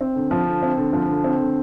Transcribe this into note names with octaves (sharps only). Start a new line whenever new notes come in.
C4
D3
F3
D3
C4
D3
F3
D3
C4
D3